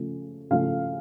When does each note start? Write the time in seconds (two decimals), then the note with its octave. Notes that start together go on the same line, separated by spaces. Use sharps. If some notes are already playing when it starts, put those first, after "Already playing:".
Already playing: C#3 F3 A3
0.50 C#3 F3 A3 F5